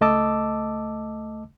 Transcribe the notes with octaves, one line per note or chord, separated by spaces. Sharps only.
C#2 A3 D#5 A5 D6 E6